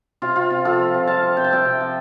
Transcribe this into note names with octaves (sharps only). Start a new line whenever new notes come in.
C3 F4
C3 F4
C3 F4
F3 F4 A4
F3
C3
C4 F5 A5
F3
C3 G5
A5
C4 E5 G5
C3
F3